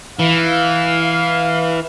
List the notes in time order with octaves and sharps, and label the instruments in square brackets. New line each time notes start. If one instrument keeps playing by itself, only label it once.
[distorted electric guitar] E3 [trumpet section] F5